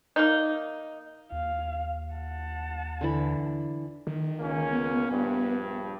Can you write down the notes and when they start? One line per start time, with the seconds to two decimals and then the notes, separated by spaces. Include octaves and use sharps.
0.16 A#3 D#4
1.32 D#2 F5
2.13 F#5 A5
3.01 D3 E3 B5
4.07 D#3
4.39 C#2 A#3 C#4
4.73 B3
5.08 A#1 G2